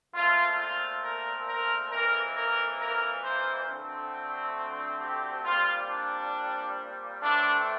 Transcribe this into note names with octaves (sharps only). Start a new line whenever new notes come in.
A#2 A3 C4 F4
F4
A#4
A#4
F2 E3 A#3 A#4
A#4
A#4
C5
D2 D3 A3 C4
G4
A#2 G3 C4 F4
D4
A2 E3 A3 C4 D4